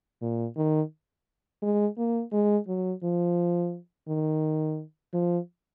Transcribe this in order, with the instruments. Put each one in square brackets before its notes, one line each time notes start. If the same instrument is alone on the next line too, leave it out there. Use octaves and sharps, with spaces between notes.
[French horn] A#2
D#3
G#3
A#3
G#3
F#3
F3
D#3
F3